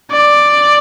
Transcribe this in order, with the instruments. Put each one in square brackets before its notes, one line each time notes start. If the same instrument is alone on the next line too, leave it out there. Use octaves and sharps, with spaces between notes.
[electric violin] D5